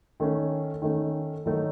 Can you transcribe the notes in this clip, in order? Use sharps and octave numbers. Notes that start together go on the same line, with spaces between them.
D#3 A3 C#4
D#3 A3 C#4
D#3 F#3 A3 D#4